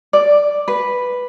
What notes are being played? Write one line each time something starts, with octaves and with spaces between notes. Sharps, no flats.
D5
B4